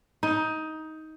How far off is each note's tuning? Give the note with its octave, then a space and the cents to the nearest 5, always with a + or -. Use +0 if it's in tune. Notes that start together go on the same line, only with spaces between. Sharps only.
D#4 +15